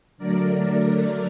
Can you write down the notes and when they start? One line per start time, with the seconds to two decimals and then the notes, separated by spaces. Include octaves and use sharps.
0.18 D3 F#3 A3 A#4 D5